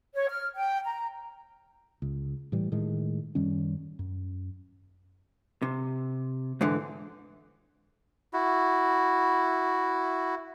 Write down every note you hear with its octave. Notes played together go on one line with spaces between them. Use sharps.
C#5
F6
G5
A#5
C#2
A2 E3 G3
A2 D#3 G#3
F#2 D#3 G3 C#4
F#2
C3
G#2 D3 E3
E4 F#4